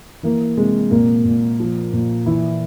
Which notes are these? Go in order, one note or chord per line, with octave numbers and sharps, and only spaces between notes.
E3 A#3
C3 G#3
A#2 A#3
A#2
F3
A#2
E3 E4